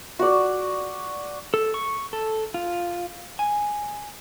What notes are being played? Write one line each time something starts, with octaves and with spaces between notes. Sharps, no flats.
F#4 D5
A4
C#6
A4
F4
G#5